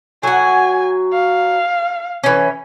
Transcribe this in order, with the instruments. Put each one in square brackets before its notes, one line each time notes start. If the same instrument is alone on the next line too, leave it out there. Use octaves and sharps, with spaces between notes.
[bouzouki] F#3 F#5 [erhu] G#5
[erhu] F5
[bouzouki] E3 C#4